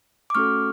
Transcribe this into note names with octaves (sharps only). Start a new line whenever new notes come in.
D6
A3 C#4 F#4 A4 C#6 F6